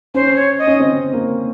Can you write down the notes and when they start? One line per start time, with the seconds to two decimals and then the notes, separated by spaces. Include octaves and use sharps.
0.14 C#4 C5
0.36 C#5
0.59 D#5
0.67 C#4
0.80 C4
1.13 A#3